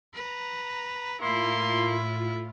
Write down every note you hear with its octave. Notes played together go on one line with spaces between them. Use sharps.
B4 A#5
A2 A#3 E4 F4 C6